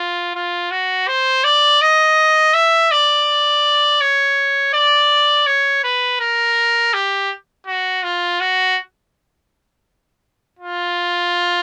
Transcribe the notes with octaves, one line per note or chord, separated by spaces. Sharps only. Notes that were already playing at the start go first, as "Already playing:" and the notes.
Already playing: F4
F4
F#4
C5
D5
D#5
E5
D5
C#5
D5
C#5
B4
A#4
G4
F#4
F4
F#4
F4